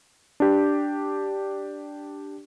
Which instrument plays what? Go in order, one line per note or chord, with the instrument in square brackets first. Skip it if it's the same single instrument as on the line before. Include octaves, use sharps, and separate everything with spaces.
[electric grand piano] D4 G4